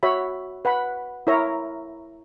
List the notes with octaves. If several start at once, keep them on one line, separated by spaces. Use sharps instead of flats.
F#4 C#5 E5 B5
B4 F#5 B5
E4 A#4 C#5 E5 A#5